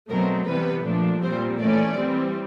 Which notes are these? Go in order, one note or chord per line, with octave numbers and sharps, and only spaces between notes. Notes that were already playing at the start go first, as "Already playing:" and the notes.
B2 F#3 A3 C4 A#4
C3 E3 G3 B3 B4
A#2 F3 A3 D4
A#2 G3 C4 C5
E3 A3 C#4 D5
E3 G3 C4